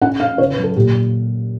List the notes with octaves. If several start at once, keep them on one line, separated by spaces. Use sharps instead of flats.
C#4 F#5
C#4 F5
C#3 C#5
B4
F#3
A4
A#2 G4